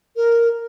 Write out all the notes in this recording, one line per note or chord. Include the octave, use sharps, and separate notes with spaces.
A#4